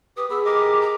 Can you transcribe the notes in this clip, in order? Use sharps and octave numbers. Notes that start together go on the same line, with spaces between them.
G4 B4 D#6
B3 G#4 B5 E6
G4 A#4 D#5 D6
A#5